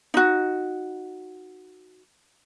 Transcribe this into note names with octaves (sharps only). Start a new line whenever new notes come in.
D#4 F#4